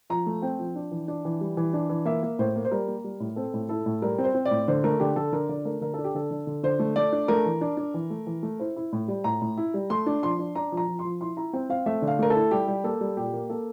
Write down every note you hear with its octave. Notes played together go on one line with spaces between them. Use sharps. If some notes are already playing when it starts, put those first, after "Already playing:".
F3 A#5
A3
C4 G5
F3
D4
E3
D4
E3
G3
E3
D4
E3
A#3 E5
A#3
A2 C5
A#3
C5
G3 A#4
A#3
G3
A2
C4 A4
A2
E4 A4
A2
G3 A#4
C4
C5
C4
D5
A2
D3 C5
A3 A#4
D3 G4
D3 A4
D3 A#4
D3 D5
A3 A#4
D3 A#4
D4 A4
G4
D3 A4
D3
D3
D3 C5
A3
A3 D5
D4
A3 A#4
E3
D4
D4
E3
A3
E3
A3
E4 C5
E4
A2
G3
A2 A#5
A2
E4
G3
A3 C6
D4
F3 C6
D4
D4 A#5
F3
A#5
F3
C6
F3
E4 C6
E4 A#5
C4 G5
C4 F5
A3 E5
D3
F5
A3 A#4
A4
E4
G3 G4
G3
A#3 A4
G3
A#2 G4
A#3
A#3 A4